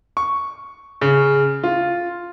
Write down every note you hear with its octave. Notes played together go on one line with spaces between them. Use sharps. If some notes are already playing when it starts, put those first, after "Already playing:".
C#6
C#3
F4